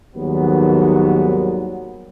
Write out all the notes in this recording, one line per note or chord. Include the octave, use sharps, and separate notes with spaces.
D#2 G#2 D#3 F#3 G3 B3